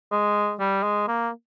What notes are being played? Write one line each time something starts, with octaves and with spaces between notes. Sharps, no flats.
G#3
G3
G#3
A#3